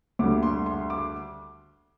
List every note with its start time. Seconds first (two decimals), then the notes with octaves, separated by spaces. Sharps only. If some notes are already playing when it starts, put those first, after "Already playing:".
0.19 D2 D3 G3 D6
0.43 C6
0.66 C6
0.90 D6